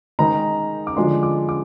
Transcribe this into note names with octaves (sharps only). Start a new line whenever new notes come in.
D#3 G#3 D#4 A#5
D6
D3 F3 G#3 D4 C6
D6
D6